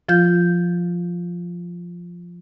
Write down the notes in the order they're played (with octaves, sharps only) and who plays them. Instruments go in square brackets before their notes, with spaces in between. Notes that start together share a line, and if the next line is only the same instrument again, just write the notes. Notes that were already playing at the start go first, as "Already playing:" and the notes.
[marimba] F3 F4 G6